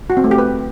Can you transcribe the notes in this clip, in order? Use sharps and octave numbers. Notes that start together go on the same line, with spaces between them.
F#4
C4
A3
G4
B4